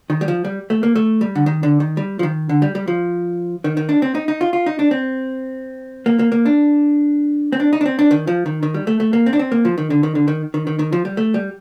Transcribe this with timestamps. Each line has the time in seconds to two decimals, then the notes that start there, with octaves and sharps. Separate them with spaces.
0.10 D#3
0.21 G3
0.28 F3
0.45 G3
0.70 A3
0.83 A#3
0.96 A3
1.21 G3
1.35 D3
1.46 D#3
1.63 D3
1.80 D#3
1.97 G3
2.19 F3
2.23 D#3
2.49 D3
2.62 G3
2.75 G3
2.88 F3
3.64 D#3
3.77 D#3
3.89 D4
4.02 C4
4.15 D#4
4.28 D#4
4.41 F4
4.53 F4
4.66 D#4
4.79 D4
4.91 C4
6.06 A#3
6.19 A#3
6.32 A#3
6.45 D4
7.52 C4
7.60 D4
7.73 D#4
7.81 D4
7.86 C4
7.99 D4
8.11 D#3
8.27 F3
8.46 D#3
8.63 D#3
8.74 G3
8.87 A3
9.00 A3
9.13 A#3
9.26 C4
9.33 D4
9.39 C4
9.52 A#3
9.65 F3
9.78 D#3
9.90 D3
10.03 D#3
10.15 D3
10.28 D#3
10.54 D#3
10.67 D#3
10.79 D#3
10.92 F3
11.05 G3
11.17 A3
11.34 G3